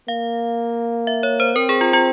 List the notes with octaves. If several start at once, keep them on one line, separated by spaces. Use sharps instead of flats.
A#3 F5
E5
C#5
C5
C4 A#4
G#4
F4
F4